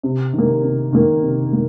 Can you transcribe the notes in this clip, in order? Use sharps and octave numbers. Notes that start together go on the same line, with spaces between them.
C3
D#3
A#3
C3
D#3 A#3
C3
A#3